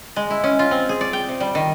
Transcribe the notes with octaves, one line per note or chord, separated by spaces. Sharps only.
G#3
E4
C#4
F4
C4
G#4
D5
G5
C3
G3
D#3